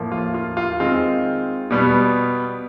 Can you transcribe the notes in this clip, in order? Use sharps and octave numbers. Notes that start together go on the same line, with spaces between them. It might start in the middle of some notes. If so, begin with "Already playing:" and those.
Already playing: A2 F3 A#3
F4
F4
F4
D#3 G#3 C4 F4
B2 G3 B3